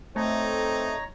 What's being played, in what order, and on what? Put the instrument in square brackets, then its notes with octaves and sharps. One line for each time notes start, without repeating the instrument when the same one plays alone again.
[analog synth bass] A3 [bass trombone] C4 [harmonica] D#4 [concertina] C#5 A#5